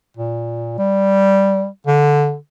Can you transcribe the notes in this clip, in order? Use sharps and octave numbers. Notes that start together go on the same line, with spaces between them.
A#2
G3
D3